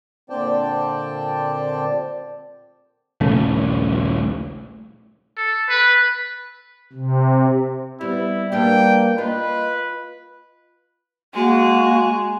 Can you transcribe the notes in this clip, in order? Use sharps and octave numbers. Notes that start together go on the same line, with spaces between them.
A#2 D3 C4 D5 G5 A5
D#1 A#1 C#3 A3
A4
B4
C3
G3 B3 E4
G3 A#3 B3 D4 G5
F4 B4 D#5
G#3 A#3 F#4